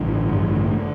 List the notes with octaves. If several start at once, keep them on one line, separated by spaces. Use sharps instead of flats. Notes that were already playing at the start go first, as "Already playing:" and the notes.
Already playing: A1 G2 D3
A1 G2 D3 G3
E3
A3
A3
D3